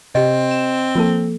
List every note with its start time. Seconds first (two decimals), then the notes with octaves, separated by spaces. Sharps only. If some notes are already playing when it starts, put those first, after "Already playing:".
0.15 C3 C4 G4 D#5
0.51 E7
0.95 F3 A#3 A4